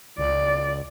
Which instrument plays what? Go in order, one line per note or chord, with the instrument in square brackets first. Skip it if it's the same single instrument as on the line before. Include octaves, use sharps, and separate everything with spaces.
[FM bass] C#2 [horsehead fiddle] D5